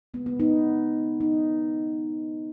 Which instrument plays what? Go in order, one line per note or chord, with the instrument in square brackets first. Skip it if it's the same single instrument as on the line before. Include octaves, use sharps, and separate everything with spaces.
[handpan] G#3 B3
C#3
B3
B3 D#4
D#4